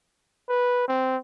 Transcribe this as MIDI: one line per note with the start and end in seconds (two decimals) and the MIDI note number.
0.49 0.88 71
0.88 1.17 60